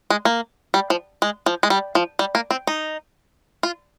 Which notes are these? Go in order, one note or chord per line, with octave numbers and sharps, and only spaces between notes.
G#3
A#3
G3
F3
G#3
F3
G#3
G3
F3
G3
A#3
C4
D#4
F4